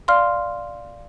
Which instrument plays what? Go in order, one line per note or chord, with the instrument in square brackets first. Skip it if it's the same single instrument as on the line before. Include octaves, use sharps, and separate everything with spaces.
[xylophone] D5 F5 C6 F6